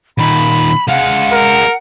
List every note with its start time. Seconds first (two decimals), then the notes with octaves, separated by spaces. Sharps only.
0.18 A#2 D#3 B5
0.88 G#3 F5 F#5
1.32 A#4